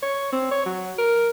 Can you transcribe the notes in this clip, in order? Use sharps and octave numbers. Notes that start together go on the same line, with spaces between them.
C#5
C4
C#5
F#3
A#4